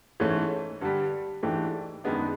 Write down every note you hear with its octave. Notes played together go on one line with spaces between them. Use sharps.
G#2 E3 A3 C#4
G2 D3 G3
G#2 E3 A3 D4 G4
F#2 D#3 G#3 B3 D4